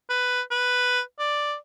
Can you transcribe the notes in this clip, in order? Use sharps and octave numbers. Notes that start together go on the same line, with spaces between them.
B4
B4
D5